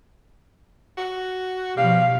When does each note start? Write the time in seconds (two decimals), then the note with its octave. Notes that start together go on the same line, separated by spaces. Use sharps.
0.98 F#4
1.77 B2 F3 G3 F5